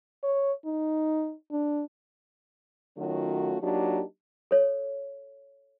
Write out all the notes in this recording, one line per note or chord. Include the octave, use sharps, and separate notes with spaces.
C#5
D#4
D4
D#3 F#3 A3 C#4 F4 F#4
F#3 A#3 D4 D#4 F4 G4
A4 C#5